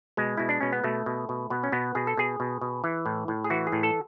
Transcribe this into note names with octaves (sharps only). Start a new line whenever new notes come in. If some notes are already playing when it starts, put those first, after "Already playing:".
B2 G#3
B2 E4
D4
B2 C#4
B3
B2 A3
B2
B2
B2 B3
C#4
B2 B3
B2 G#4
A4
B2 G#4
B2
B2
E3
A2
A2
G#4
E3 F#4
G#4
A2
A4